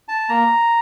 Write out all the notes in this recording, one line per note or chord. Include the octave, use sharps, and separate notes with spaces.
A5
A#3 A#5